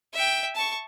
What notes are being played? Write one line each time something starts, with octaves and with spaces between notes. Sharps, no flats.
E5 G5
A5 C#6